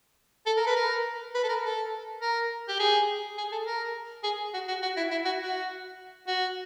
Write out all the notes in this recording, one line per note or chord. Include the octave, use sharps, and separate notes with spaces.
A4
A#4
B4
A#4
B4
A4
A#4
A4
A#4
G4
G#4
G#4
A4
A#4
G#4
F#4
F#4
F#4
E4
E4
F#4
F#4
F#4